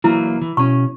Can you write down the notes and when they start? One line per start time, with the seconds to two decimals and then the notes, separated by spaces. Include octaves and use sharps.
0.04 E3 F#3 A#3 E4
0.41 E3
0.57 B2 C#4 C#6